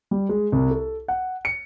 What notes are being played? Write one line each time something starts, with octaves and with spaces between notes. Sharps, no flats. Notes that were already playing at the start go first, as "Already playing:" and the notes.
G3
G#3
C2
A4
F#5
C#7